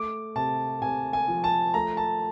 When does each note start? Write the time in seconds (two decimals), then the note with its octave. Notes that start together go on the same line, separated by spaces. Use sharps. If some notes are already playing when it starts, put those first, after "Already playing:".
Already playing: A3 D6
0.35 C3 A5
0.82 C3 G#5
1.13 G#5
1.28 F3
1.44 A5
1.74 A3 A#5
1.97 A5